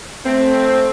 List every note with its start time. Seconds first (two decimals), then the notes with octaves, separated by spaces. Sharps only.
0.25 A3 C4